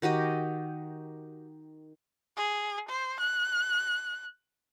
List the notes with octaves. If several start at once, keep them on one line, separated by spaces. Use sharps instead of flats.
D#3 F#4 G4 D#5
G#4
C5
F#6